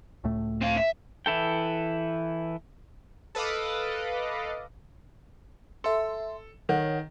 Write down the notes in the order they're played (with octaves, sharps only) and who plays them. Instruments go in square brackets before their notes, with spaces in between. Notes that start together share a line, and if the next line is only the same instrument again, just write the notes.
[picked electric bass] C#2 A2 A3
[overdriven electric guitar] C4 F5
E5
[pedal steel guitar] E3 E4 A4 G5
[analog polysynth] A4 B4 D#5 F5 D6
[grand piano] A4 [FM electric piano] E5 C6
[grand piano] D#3 [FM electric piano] C#5 F#5